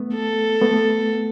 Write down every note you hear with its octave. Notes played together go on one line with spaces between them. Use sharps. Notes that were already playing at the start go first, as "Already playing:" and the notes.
Already playing: A3 B3
A4
A3 B3